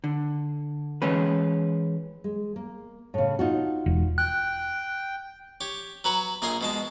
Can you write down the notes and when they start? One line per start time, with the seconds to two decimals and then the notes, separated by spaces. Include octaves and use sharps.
0.04 D3
1.02 E3 G#3 C#4 B4
2.24 G#3
2.56 A#3
3.14 A2 C#3
3.39 D#4 F4 F#4
3.86 E1
4.18 G5 F#6
5.61 G4 C#5
6.04 F#3 B4 A#5 C#6
6.42 A#1 A#2 G#4 A#5 C6
6.61 B2 G#3 A5